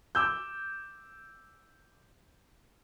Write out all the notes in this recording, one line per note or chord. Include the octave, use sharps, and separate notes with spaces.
D6 E6 G6